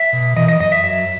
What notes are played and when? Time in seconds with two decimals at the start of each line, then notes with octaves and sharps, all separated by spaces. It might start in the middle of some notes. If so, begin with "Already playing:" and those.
Already playing: E5
0.13 B2
0.37 E3 D#5
0.48 D#5
0.60 F#2 D#5
0.72 E5
0.83 F#3 E5